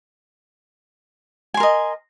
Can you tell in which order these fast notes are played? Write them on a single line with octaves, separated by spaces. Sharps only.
G#5 C6 A#4 D#5